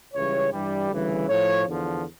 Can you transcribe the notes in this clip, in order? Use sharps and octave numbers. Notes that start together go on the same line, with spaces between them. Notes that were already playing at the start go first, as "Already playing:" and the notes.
C#2 C#3 E3 G3 C#5
G2 E3 G3
D2 C#3 E3 G3
A2 F3 C#5
E2 D3 F3